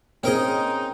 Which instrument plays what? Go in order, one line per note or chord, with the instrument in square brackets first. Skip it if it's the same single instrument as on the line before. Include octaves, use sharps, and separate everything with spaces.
[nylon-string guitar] C4 G#4 [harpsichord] C#4 A#4 D#5 [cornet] D#4